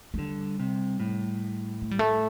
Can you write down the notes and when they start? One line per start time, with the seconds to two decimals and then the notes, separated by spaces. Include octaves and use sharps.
0.14 A3
0.18 D3 G3
0.60 C3
1.00 A2
1.82 A3
1.91 G3
1.99 A3